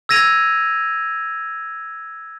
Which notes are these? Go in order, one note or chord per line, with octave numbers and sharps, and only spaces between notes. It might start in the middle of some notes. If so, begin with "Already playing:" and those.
E6 G#6 A#6 D#7 F7